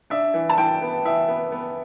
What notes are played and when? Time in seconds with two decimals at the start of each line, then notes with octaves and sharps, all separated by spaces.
0.10 D4 E5
0.34 E3
0.49 A5
0.57 E3 G5
0.82 B3
1.05 E3 E5
1.28 B3
1.52 B3